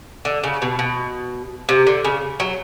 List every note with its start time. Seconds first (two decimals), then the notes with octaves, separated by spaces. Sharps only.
0.25 D3
0.44 C#3
0.62 B2
0.79 B2
1.69 C3
1.87 D3
2.05 C#3
2.40 F#3